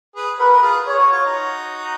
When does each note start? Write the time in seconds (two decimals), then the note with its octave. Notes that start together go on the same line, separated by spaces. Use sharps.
0.16 G#4 B4
0.39 F#4 A#4 B4
0.53 A#4
0.62 F4 G#4
0.85 G#4 C#5
0.99 F#4
1.12 F4
1.25 D#4 F#4